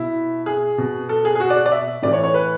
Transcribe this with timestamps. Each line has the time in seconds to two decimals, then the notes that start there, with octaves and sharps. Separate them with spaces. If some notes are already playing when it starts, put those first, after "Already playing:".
Already playing: B2 E4
0.46 G#4
0.78 B2
1.09 A4
1.25 G#4
1.35 G#4
1.40 F#4
1.50 D5
1.66 D5
1.72 E5
2.02 A2 E3 D5
2.13 C#5
2.24 C#5
2.34 B4